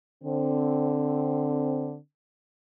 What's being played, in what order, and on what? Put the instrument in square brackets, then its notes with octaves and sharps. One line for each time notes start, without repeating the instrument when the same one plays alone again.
[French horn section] D3 C4